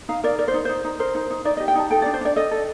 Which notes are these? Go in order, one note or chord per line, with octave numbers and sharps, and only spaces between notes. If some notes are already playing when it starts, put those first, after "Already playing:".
D#4 F5
A#4 D5
A#4 D5
C5
D#4
D#4 C5
D#4
A#4 C5
D#4
D#4
D#4 D5
G4 D#5
G5
D#4 A5
A4 G5
D4 D5
C5
D4 D5
A4 D#5
A4